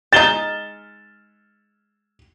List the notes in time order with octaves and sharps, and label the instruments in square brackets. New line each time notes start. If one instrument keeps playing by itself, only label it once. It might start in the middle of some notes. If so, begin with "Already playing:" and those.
[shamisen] G#3 D#4 [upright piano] A6 E7 G7